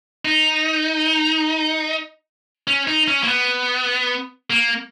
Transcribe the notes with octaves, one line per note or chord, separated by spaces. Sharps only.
D#4
C#4
D#4
C#4
A#3
B3
A#3